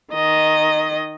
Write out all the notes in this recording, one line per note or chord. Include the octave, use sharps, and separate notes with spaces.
D#3 D#5